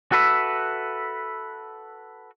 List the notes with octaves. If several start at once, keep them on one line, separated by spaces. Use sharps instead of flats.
F#4 A4 B4 E5